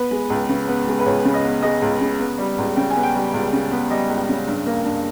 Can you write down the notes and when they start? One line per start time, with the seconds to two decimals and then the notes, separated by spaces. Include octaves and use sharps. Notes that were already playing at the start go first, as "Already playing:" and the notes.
Already playing: B3 B4
0.11 G#3
0.30 C#2
0.49 C#3
0.68 B3
0.87 G#3
0.99 B4
1.06 C#2 C#5
1.25 C#3
1.34 D#5
1.44 B3
1.62 G#3 D#5
1.82 C#2
2.01 C#3
2.20 B3
2.39 G3
2.58 C#2
2.76 C#3 G5
2.90 G#5
2.96 B3
3.03 G5
3.15 G3
3.34 C#2
3.53 C#3
3.72 B3
3.90 G3 D#5
4.09 C#2
4.29 C#3
4.48 G2
4.66 A#3
4.85 G2